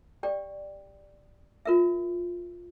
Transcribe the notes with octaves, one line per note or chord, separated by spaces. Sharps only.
G4 D5 G5
F4 A#4 E5